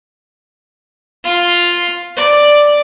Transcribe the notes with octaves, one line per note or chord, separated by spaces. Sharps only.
F4
D5